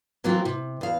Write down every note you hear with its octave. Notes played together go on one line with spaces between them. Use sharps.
E3 F#3 A#3 C4 F4 F#4
C3
E2 F5